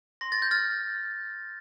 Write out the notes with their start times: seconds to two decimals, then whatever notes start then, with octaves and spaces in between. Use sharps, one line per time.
0.21 C6 A#6
0.32 A6
0.42 G6
0.51 F6 A6